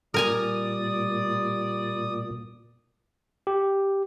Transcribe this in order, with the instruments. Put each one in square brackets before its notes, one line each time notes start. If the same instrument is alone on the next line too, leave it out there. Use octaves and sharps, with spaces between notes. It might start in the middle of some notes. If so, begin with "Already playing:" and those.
[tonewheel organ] A#2 [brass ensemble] G3 D5 [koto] A#4 G#5 A#5 [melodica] D#6
[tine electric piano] G4